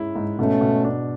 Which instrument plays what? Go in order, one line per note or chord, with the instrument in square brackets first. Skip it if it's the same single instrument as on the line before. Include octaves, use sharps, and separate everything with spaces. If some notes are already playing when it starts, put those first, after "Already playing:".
Already playing: [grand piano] G#2 G#3 C#4 E4
G#2
[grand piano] B2 [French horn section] A3 C#4
[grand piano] B2
D4